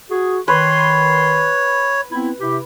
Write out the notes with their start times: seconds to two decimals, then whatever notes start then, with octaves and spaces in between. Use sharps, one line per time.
0.11 F#4 G#4
0.48 D#3 B4 C#5 C6
2.12 B3 C4 E4
2.40 C3 E4 G4